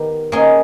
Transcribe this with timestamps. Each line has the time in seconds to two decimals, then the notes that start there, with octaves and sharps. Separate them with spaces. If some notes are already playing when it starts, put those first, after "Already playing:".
Already playing: D#3 B3 G4 A#4
0.32 A#3 C#4 G#4 D#5